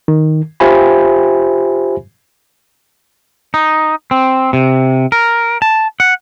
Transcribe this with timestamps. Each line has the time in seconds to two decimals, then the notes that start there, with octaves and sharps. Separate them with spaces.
0.08 D#3
0.60 F4 G4 C5 E5 G#5 B5
3.54 D#4
4.11 C4
4.53 C3
5.12 A#4
5.62 A5
6.00 F#5